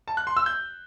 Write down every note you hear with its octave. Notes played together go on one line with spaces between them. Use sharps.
A5
F#6
C6
E6
G6